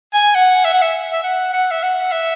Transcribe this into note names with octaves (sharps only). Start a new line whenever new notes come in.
G#5
F#5
E5
F#5
E5
E5
F#5
F#5
E5
F#5
E5